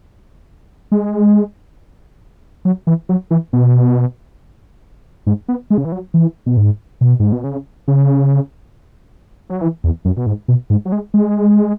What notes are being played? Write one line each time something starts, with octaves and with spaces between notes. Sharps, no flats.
G#3
F#3
E3
F#3
E3
B2
G#2
B3
G#3
C#3
E3
F#3
E3
B2
G#2
B2
G#2
B2
C#3
C#3
F#3
E3
E2
F#2
B2
G#2
B2
G#2
F#3
G#3
G#3